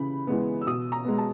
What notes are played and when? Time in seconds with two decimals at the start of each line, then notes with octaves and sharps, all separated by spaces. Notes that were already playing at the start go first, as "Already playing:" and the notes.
Already playing: C#3 E3 B5
0.27 E3 G#3 B3
0.61 E6
0.67 B2 D#6
0.92 A#5
1.05 G#3 B3
1.18 A5